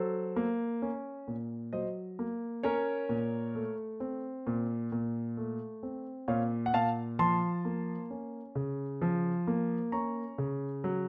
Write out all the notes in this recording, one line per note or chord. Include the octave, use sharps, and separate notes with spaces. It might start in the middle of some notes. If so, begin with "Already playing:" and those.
Already playing: F#3 A4 C5
A#3
C#4
A#2
F#3 C5 D#5
A#3
C#4 A#4 C#5
A#2
A3
C4
A#2
A#2
A3
C4
A#2 C#5 F5
F#5
A#2 F5 A5
F3 A5 C6
A#3
C#4
C#3
F3
A#3
C#4 A#5 C#6
C#3
F#3